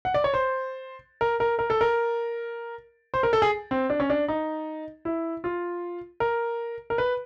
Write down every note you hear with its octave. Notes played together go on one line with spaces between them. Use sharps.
F#5
D5
C#5
C5
A#4
A#4
A#4
A4
A#4
C5
A#4
A4
G#4
C4
D4
C#4
D4
D#4
E4
F4
A#4
A#4
B4